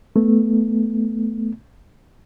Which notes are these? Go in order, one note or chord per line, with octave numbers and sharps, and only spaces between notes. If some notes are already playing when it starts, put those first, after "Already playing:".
A3 B3